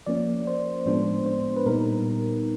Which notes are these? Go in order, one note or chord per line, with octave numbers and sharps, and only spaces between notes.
F3 A#3 C#4 D5
C5
A2 F3 G#3 B3 D4 C5
C5
B4
A#2 G3 B3 D#4 A#4